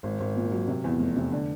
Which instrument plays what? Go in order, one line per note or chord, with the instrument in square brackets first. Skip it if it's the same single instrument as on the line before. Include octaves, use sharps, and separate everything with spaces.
[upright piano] G#1
G#1
A#2
F#3
C3
E2
F1
C3
D3